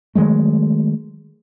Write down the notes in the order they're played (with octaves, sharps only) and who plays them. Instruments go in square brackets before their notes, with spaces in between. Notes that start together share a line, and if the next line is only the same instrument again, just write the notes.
[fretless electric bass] D#3 F#3 G#3 A3